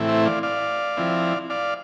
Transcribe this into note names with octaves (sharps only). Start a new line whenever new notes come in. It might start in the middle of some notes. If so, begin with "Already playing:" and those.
Already playing: A2 E3 A3 C4 E4
C5 E5
D5 F5
D5 F5
F3 C4 E4
D5 F5